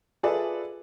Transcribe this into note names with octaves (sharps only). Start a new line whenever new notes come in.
F4 G#4 A4 B4 D5 E5